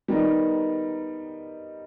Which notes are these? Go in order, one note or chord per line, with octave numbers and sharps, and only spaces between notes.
D#3 G3 B3 D#4